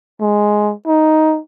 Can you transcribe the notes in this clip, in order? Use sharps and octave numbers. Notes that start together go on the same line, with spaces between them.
G#3
D#4